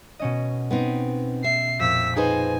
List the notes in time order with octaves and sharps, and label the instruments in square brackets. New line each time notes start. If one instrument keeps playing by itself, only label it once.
[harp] B2 C#4 D#5
[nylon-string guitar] B3 C4 D#4
[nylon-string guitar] E5 [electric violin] C7
[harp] F2 A#2 [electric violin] E6 B6
[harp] D#4 [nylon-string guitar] G#4 B4 C5 [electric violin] G#5